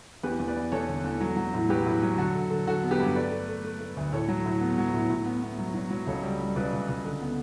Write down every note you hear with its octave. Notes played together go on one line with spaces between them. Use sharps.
E2 G4 B4
E2
B4 D5
E2
E2 A4 C#5
D3
E2
F#3
F#3
A2
F#3 G4 B4
A2
F#3
D3 F#4 A4
D3
D3
D3 F#4 A4
B3
G4 B4
G2
A3 B4 D5
A3
A3
A3
A3
D2
A2 A4 C#5
F#3
A2
B3
F#3
A2
A2
B3
B3
F#3
F#3
F#3
C#2 A4 C#5
G3
G3
C#2 B4 D5
C#2
C#2
D3
B3